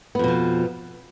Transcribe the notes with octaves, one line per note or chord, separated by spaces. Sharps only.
F2 B2 F3 B3